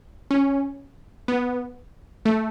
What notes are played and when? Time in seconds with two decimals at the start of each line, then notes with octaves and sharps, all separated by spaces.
0.31 C#4
1.28 B3
2.25 A3